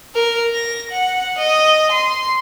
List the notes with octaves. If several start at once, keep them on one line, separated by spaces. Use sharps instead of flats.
A#4
A#6
F#5
D#5
C6